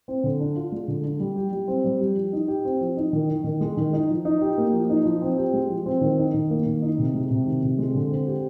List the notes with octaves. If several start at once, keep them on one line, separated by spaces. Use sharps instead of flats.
C4
D3
D4
F4
G#3
D3
D4
G3
G4
G3
C4
G3
G4
F3
D#4
G4
C4
F3
D#4
D#3
D#4
D#3
G#3
D#3
D#4
F3
D#4
G4
A#3
F3
D#4
F3
C4
G4
G#3
F3
C4
D#3
D#4
D#3
A#3
D#3
D#4
C3
G#3
C3
D#3
C3
G#3
D3
C4
G4